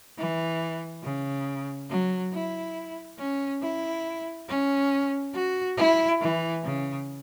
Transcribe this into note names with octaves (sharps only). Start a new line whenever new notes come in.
E3
C#3
F#3
E4
C#4
E4
C#4
F#4
E4
E3
C#3